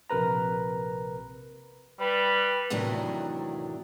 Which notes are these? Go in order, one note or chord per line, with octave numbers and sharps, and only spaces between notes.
A#1 C3 A#4 B4 A#5
G3 B4
E2 A2 C3 D#3 F#3 D4